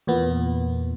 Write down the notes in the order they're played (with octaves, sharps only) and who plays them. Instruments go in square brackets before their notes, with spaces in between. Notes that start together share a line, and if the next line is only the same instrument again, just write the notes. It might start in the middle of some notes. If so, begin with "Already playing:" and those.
[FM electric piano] E2 A#2 B3